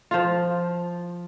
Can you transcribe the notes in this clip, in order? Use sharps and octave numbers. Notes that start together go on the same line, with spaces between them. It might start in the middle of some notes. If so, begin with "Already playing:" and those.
F3 F4